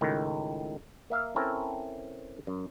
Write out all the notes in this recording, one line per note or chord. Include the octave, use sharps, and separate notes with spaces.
C#2 A2 D#3
A#3 E5 F5
C4 C#4 E4 A4 A#4
F#2